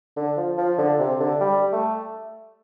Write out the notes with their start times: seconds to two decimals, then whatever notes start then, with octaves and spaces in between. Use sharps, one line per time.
0.17 D3
0.37 F3
0.57 F3
0.78 D3
0.99 C3
1.20 D3
1.41 G3
1.72 A3